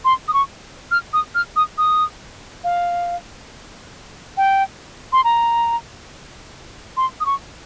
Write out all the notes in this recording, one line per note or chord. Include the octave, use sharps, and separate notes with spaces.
C6
D#6
C#6
F6
D#6
F6
D#6
D#6
F5
G5
C6
A#5
C6
D#6
C#6